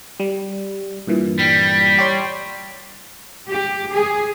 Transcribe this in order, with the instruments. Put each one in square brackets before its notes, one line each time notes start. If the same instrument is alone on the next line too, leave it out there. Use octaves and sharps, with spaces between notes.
[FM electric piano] G3
G2 A#2 E3
[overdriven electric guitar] G3
[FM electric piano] G4 C#5 C6
[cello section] G4
G#4